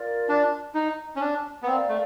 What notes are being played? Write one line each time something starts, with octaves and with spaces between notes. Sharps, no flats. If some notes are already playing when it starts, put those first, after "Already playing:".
Already playing: F4 A#4 D5
D4
D#4
C#4
D4
B3
C4 A#4 D5 F5 A#5
A3